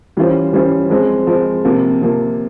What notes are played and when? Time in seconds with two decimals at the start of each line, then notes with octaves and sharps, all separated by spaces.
0.17 E3 G3 C#4 F4 C5
0.53 E3 G3 C#4 F4 C5
0.90 F3 G#3 C4
1.27 F3 G#3 C4
1.65 C3 F3 A#3
2.01 C3 F3 A#3